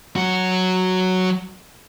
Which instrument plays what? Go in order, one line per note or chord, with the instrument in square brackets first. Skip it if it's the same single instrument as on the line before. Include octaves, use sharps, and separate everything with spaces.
[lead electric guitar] F#3 F#4